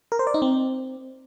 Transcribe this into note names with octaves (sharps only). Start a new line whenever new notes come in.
A#4
C5
D5
D#4
C4